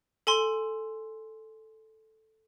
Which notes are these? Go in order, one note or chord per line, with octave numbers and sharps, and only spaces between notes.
A4 G#5 C6